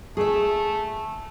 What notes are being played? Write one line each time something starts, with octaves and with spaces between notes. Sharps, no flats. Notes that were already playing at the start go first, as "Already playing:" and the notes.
A3 G#4 E5